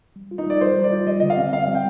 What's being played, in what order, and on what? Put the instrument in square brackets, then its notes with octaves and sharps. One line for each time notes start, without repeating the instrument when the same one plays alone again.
[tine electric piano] G3
F4
[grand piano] D#4
[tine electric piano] G3 [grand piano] D5
[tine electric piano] G3 [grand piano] C5
[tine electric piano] G3
[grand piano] D5
[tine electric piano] F4
[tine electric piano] G3 [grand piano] D#5
[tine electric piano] D3 [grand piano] D#5
[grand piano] F5
[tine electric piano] C4
[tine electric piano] C4 [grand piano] F5
[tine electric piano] G3
[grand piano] G5